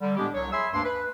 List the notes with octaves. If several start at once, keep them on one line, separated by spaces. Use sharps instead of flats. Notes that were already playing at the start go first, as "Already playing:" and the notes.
D3 G3
A2 G#3 B3 D4 G4
C2 F#3 C#5
G#4 E5 G#5 B5 C6 E6
D2 G2 A#3 D4 C6
B4